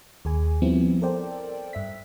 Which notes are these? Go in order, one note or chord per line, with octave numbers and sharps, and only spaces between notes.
D#2 G#4 G#5
F3 G3 B3 C4 E4
A4 A#4 C5 D5 G5
G2 E5 B6